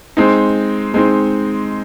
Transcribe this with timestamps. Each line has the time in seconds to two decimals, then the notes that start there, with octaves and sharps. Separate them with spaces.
0.17 G#3 C4 D#4
0.94 G#3 C4 D#4